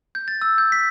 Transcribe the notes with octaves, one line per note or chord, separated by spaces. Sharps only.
G6
A6
E6
G6
B6